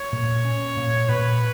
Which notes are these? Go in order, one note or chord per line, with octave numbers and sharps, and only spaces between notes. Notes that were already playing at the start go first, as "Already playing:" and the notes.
Already playing: C#5
A#2
C#4
A#2
A#2 B4